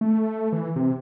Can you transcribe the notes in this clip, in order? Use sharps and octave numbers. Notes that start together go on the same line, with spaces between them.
A3
E3
C3